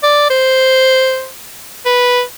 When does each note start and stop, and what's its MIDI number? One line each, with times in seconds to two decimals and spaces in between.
0.03 0.30 74
0.30 1.27 72
1.86 2.22 71